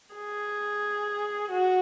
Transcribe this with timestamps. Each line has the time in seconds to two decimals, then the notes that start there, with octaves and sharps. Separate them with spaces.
0.15 G#4
1.51 F#4